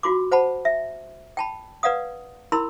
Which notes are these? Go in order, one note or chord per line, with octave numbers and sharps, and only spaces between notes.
F4 F#4 C6 D6
C5 F#5 A5 B5
E5
G5 A5 B5
B4 D5 F5 F#5 D#6
E4 A#4 B5 C6 E6